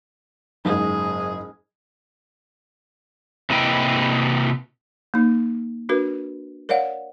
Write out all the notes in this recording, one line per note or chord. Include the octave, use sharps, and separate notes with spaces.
F#1 G#2 G#4
C3 A#3 E4 B4 D#5 G5
A#3 D#4
D4 F#4 A#4 B4
A#4 C#5 D5 F5 F#5